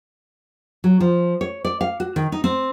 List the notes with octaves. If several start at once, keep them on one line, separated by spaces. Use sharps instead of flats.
F#3
F3
C#5
D5
F5
F#4
D#3
D#4
C4